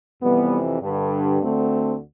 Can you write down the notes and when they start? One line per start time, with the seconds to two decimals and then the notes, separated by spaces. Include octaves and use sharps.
0.21 F2 C3 E3 G3 B3
0.81 G2 D3
1.41 D2 D3 A3 C4